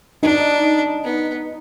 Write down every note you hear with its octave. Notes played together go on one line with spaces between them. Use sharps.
D4 D#4
B3